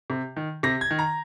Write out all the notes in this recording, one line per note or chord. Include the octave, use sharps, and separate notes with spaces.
C3
D#3
C3 A#6
G#6
D#3
A#5